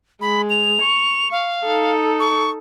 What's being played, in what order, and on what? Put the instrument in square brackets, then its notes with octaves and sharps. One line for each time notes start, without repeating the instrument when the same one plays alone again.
[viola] G#3 [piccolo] B5
[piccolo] F7
[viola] C#6
[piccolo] F5
[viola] D#4 A4
[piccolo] C#6